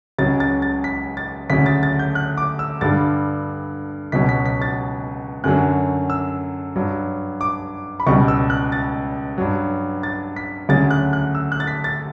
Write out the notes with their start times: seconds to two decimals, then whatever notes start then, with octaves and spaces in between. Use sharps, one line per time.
0.18 C#2 C#3 F#3 A6
0.40 A6
0.62 A6
0.84 B6
1.17 A6
1.50 D2 C#3 F#3 B6
1.66 A6
1.83 A6
1.99 G6
2.15 F#6
2.37 D6
2.59 E6
2.81 G2 D3 G3 A6
4.12 C#2 B2 F#3 B6
4.29 B6
4.46 B6
4.62 A6
5.44 F#2 D3 F#3 F#6
6.10 E6
6.75 G2 F#3
7.41 D6
8.00 B5
8.07 C#2 B2 G3 C#6
8.28 E6
8.50 F#6
8.72 A6
9.38 G2 F#3
10.03 A6
10.36 B6
10.69 D2 C#3 F#3 A6
10.91 F#6
11.13 F#6
11.35 E6
11.52 F#6
11.60 A6
11.67 B6
11.84 A6